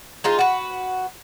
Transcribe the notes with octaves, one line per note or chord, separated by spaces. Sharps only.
G#3 D#4 F4
F#4 B4